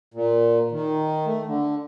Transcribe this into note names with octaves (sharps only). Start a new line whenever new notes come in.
A#2
D#3
A3
D3